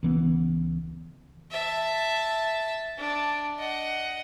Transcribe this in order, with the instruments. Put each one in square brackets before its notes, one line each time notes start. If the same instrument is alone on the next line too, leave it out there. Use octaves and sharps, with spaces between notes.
[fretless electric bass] C#2 E3 B3
[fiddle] E5 A5
D4
D#5 F#5